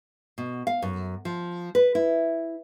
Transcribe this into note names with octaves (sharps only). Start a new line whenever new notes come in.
B2
F5
F#2
F3
B4
E4